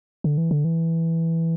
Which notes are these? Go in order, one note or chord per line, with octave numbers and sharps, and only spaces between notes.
D3
E3
D3
E3